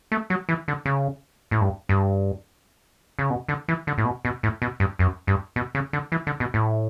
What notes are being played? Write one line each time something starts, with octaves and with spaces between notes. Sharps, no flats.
A3
F#3
E3
D3
C#3
A2
G2
G2
C#3
B2
D3
E3
D3
A2
B2
B2
A2
B2
G2
F#2
G2
B2
C#3
D3
E3
D3
B2
A2